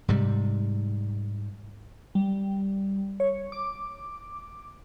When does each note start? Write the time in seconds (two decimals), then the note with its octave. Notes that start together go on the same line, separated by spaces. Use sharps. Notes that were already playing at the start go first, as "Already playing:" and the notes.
0.08 G#2 C3 G3
2.15 G3
3.20 C#5
3.52 D6